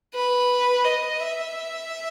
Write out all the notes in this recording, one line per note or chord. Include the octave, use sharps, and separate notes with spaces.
B4
D#5
E5